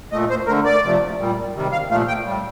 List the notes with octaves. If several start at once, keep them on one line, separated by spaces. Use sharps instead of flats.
A#2 A3 D#5
C5
D3 A3 A#4
D5
C3 F3 A3
A#2 G3
C3 D#3 G3
F5
A#2 F3 A3 F5
G5
A2 G3